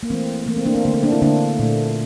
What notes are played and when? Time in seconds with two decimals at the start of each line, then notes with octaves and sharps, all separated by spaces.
0.03 A#3
0.10 E3 A3 C4
0.47 E3 A3 A#3
0.57 C4
0.66 A#3 D4
0.75 C4
0.85 D3 A3 A#3
0.94 C4
1.03 A#3 D4
1.12 C4 E4
1.22 D3 A3 A#3 D4
1.59 A#2 A3